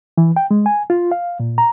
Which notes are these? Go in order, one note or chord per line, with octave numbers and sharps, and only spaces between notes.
E3
G5
G#3
G#5
F4
F5
A#2
A#5